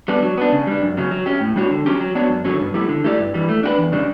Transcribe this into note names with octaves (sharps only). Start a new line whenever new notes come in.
G3 B3 D4
F#3
B3 D4
C#3
G3 D4
F#2
C#3 F#3 C#4
F#3
C#4 G4
A2
G3 D4 F#4 C#5
D3
F#3 C#4 G4
F#3
B3 D4 F#4 C#5
F#2
D3 F#3 C#4
G2
F#3 A3 E4 G4
D3
A3 E4 G4 D5
G2
E3 G3
A3
D4 F#4 B4
E2
C#3 G3 D4